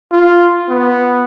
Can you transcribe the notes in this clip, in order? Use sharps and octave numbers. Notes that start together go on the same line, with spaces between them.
F4
B3